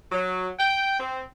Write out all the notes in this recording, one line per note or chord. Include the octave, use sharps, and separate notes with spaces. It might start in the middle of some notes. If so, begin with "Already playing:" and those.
F#3
G5
C4